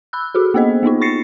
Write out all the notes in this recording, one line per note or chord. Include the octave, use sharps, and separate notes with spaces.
B5 E6 F#6
F#4 G#4 A4
A#3 B3 G#4 C5 D#5
A#3 B3 D#4 F4
C#6 A6 A#6 C7 C#7